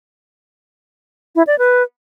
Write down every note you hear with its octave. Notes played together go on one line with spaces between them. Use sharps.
E4
D5
B4